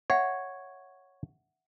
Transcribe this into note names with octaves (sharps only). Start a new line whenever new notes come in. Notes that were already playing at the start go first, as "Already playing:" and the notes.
C#5 E5 F#5